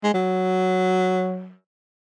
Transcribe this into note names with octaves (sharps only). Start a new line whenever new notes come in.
G#3
F#3